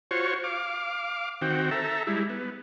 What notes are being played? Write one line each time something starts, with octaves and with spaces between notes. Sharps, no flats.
F4 F#4 C5 C#5 C#6
F5 D6
D#3 C4 F#4 G5
A4 E5 A#5
G3 G#3 E4
B3